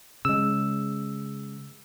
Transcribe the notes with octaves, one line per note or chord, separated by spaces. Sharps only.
C#3 G#3 E6